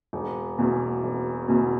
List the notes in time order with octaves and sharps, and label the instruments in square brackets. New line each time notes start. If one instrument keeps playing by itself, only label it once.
[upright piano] E1
E2 B2
E1
E2 B2